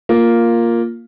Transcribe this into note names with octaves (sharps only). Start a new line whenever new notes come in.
A#3 F4